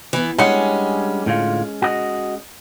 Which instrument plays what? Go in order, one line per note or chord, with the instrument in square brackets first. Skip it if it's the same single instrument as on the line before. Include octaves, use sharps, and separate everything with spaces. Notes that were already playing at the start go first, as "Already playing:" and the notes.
[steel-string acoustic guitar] E3 B3
[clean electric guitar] G3 D4 F#5 [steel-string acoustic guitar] G#3 C#4
[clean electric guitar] A2 D3 F4
F#4 D#5